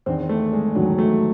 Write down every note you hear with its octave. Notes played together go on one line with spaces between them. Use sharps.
E2 D#3 C4
A3
G#3
E2 D#3 F#3
A3